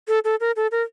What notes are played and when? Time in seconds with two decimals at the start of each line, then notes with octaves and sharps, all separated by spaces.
0.08 A4
0.25 A4
0.41 A#4
0.56 A4
0.72 A#4